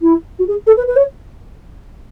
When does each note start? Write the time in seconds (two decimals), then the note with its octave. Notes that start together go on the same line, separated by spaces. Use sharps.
0.01 E4
0.38 F#4
0.47 G#4
0.66 A4
0.77 B4
0.87 B4
0.95 C#5